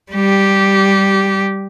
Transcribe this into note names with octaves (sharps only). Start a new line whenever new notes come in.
G3 G4